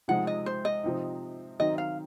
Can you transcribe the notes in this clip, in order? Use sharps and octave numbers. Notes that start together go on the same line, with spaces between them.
C3 F3 G#3 D#4 F#5
D#5
C5
D#5
C3 F3 C4 D#4
D#3 F#3 C4 D#4 D#5
F5